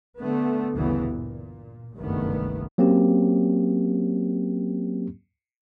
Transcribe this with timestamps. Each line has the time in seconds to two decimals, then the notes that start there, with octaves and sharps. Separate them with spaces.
0.18 D3 A3 B3
0.77 G1 D2 C#3 E3 B3
1.11 A#2
1.95 F#1 C2 G2 D#3 A3 B3
2.78 F#3 A#3 C4 C#4 G4